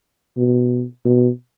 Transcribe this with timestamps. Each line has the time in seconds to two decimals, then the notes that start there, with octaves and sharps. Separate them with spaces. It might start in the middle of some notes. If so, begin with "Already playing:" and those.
0.37 B2
1.05 B2